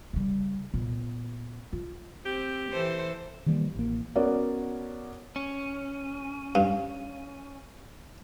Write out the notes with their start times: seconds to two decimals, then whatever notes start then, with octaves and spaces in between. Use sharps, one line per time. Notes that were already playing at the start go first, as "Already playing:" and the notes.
0.13 C#3 G3
0.74 A#2 B3
1.73 F4
2.25 C4 G4
2.72 E3 A4 C5
3.46 D#3 E3 G3 A#3
3.75 A1 A#3
4.16 B3 C#4 F#4 A#4 D5
5.36 C#4
6.55 G2 F5